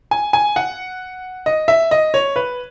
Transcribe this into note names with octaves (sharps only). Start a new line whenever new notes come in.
G#5
G#5
F#5
D#5
E5
D#5
C#5
B4